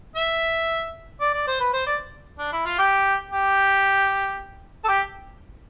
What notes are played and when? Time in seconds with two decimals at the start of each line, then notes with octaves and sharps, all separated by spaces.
0.16 E5
1.21 D5
1.34 D5
1.47 C5
1.60 B4
1.73 C5
1.87 D5
2.39 D4
2.52 E4
2.65 F4
2.78 G4
3.31 G4
4.84 A4
4.88 G4